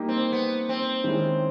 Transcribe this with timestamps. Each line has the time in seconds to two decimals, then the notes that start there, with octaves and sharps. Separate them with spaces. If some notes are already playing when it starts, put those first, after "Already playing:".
Already playing: G3 A#3 D#4 G4
0.09 C4
0.32 B3
0.69 C4
1.04 D#3 G#3 C#4 E4 G#4